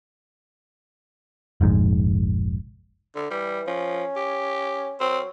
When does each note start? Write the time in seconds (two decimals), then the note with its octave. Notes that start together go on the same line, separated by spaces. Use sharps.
1.61 F1 A#1 G#2
3.16 D3
3.31 E3 G3
3.67 F3 C#4
4.16 G4
5.00 F#3 C4